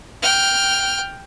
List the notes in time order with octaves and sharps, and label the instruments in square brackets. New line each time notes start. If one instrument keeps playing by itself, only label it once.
[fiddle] G5 F6